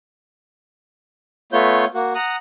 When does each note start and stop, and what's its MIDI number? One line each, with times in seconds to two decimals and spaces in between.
1.52 1.85 57
1.52 1.85 59
1.52 1.85 65
1.52 1.85 73
1.52 1.85 91
1.94 2.14 58
1.94 2.14 66
2.15 2.36 78
2.15 2.36 82
2.15 2.36 87
2.15 2.36 90